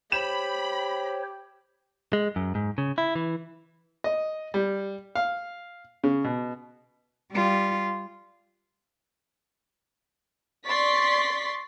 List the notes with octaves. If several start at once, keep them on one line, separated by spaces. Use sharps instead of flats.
G4 C5 C#5 B5 E7
G#3
F#2
G#2
C#3
E4
E3
D#5
G3
F5
C#3
B2
G3 F4
D5 C6 C#6 A6 B6